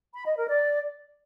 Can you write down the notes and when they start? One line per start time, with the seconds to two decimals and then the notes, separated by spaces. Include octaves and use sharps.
0.14 B5
0.26 D#5
0.37 A#4
0.48 D5